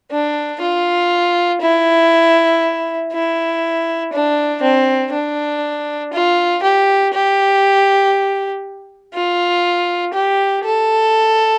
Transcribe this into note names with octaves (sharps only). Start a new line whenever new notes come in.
D4
F4
E4
E4
D4
C4
D4
F4
G4
G4
F4
G4
A4